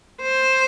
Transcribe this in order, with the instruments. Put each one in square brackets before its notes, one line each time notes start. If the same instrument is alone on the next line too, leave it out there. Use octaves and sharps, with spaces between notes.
[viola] C5